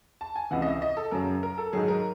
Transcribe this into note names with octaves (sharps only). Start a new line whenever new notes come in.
A5
G#5
C#2 C3 E3 F#5
D#5
E5
D#5
A4
F#2 C#3 F#3 A#4
A#4
A4
G#2 D#3 F#3 G#4
A#4